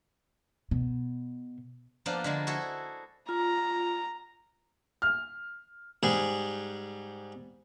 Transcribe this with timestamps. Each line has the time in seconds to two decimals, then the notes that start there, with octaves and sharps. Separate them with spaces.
0.71 B2
2.06 F3 A#3 B3 D4 F4 D5
2.24 D3 G#3 A#3
2.47 E4 F#4 G#4 A4
3.29 F4 A#5
5.02 F6
6.03 G#2 G3 G#4